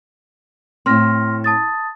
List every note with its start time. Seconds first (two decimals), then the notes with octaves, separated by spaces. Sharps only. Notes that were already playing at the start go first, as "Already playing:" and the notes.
0.86 A2 C4 C6 F6 A#6
1.44 A5 D#6 A6